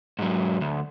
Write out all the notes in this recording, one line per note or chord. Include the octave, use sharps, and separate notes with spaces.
G#2 F#3
D2